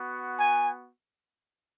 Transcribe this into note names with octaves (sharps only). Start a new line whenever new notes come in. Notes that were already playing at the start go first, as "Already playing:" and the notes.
Already playing: B3 F#4
G#5